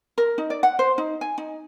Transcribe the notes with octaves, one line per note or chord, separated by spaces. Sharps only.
A#4
D#4
D5
F#5
C5
D#4
G#5
D#4